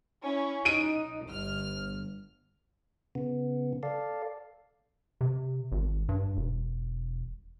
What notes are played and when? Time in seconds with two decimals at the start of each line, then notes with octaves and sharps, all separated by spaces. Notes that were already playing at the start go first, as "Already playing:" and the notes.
0.23 C#4 E4
0.65 D#4 D7 D#7
1.27 G1 F6
3.15 C#3 B3
3.83 A4 D5 F5
5.21 C3
5.72 G#1
6.09 G2
6.37 E1